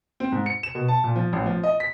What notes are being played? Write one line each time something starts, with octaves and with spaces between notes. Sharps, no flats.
C4
G#2
C#7
E7
B2
A5
A#2
F3
A1
F3
D#5
B6